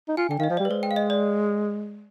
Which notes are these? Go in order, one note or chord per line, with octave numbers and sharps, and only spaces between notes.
D#4
F4 G#5
D3 G5
D#3 D#5 F5
F3
D5
G3
B4
G#3 C5
G5
F5
D#5
D5